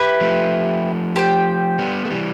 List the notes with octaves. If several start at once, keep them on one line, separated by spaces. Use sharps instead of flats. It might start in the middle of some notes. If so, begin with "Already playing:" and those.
Already playing: E4 G4 B4
F3 A3
G4 C5 G5
G3 B3
A3
E3 G3